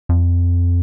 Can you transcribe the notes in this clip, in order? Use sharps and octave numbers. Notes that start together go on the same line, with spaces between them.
F2